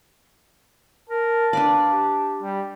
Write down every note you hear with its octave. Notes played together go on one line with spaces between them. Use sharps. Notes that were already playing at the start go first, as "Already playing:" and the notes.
A#4 A5
D4 B4 D5 F5
G4
G3